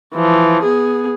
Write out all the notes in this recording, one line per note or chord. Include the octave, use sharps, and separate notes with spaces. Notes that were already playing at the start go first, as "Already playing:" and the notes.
E3 F3
B3 G#4